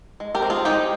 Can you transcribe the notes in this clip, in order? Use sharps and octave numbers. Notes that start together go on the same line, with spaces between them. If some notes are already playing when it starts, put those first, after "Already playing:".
G#3
G4 A#4
C4
F4 G#4
G#3 D#4 G4